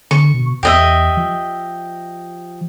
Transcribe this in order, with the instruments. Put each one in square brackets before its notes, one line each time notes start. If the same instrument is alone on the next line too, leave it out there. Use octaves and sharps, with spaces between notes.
[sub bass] D3 [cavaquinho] C#6
[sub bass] B2
[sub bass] E2 [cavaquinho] G4 D#5 E5
[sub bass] F3